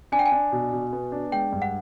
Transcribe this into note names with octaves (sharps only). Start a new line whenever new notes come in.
D4 G#5
G5
G#5
D4
B2
B2
B3
D4
G#3 G5
G2
F#5